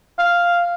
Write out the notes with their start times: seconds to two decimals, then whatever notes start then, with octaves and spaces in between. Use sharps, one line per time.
0.19 F5